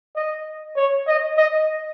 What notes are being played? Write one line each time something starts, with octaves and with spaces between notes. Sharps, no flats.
D#5
C#5
D#5
D#5